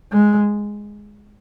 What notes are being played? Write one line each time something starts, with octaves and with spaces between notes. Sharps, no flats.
G#3